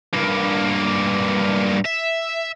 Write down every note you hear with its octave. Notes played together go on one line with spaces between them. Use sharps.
G2 A#3
E5